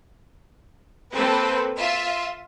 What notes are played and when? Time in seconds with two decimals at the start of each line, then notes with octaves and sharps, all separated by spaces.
1.13 A#3 C4 A4 B4
1.77 F4 E5